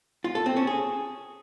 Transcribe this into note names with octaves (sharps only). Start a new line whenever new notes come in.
F4
A4
C4
C#4
G#4